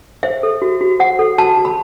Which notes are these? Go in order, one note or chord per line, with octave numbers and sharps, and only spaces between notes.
C5 E5
A4
F#4
F#4
C5 F#5
A4
F#4 A5
F#4
B5